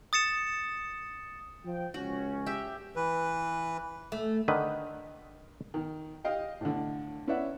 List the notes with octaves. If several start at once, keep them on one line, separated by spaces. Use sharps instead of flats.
D#6 A6 C#7 E7
F3 G5
C#2 C#4 F#4
G4 E5
E3 B4
A3
D3 D#3 B4
D#3
G4 D#5 F5 G5
A2 D3
C#4 E4 B4 D5 E5 F#5